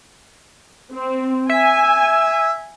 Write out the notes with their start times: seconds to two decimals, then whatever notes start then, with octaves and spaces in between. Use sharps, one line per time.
0.92 C4
1.49 E5 G#5